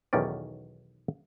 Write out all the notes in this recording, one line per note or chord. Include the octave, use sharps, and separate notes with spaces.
B1 E2 D#3 C#4 D5